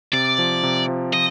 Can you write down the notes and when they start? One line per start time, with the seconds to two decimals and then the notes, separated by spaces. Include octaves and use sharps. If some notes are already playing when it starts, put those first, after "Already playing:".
0.13 C3 D5
0.39 F3
0.63 C3
0.88 F3
1.13 F3 D#5